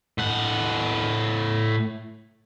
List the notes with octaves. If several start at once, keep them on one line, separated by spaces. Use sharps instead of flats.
A2 F#5